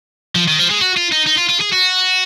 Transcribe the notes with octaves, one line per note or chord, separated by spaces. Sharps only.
F3
D#3
F3
G#3
F#4
F4
D#4
D#4
F4
F4
G#4
F#4